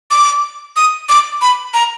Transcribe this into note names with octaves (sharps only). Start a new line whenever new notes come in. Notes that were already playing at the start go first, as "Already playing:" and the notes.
D6
D#6
D6
B5
A#5